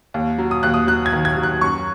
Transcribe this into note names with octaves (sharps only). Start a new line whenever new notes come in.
D#2
F#3
D#6
D#2 F#6
D#6
F#3 F#6
G#6
D#3
G#6
F#3
F#6
F#2 C#6